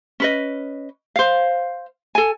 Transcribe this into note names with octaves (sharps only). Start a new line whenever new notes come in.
C#4 B4 D#5
C5 F5
A4 G#5